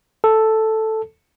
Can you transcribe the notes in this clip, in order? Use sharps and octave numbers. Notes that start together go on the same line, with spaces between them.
A4